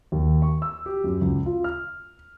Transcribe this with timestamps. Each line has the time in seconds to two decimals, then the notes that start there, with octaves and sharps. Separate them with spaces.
0.12 D#2
0.42 C#6
0.62 E6
0.86 G4
1.04 F#2
1.21 C#2
1.46 F4
1.64 F6